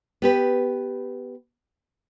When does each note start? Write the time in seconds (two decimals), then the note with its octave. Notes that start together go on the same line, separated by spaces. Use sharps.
0.22 B3 G4 B4